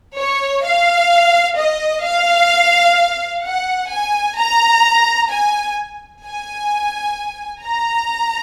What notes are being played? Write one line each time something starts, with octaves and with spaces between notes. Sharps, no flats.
C#5
F5
D#5
F5
F#5
G#5
A#5
G#5
G#5
A#5